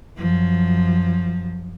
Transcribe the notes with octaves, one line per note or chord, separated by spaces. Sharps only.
F#2 F3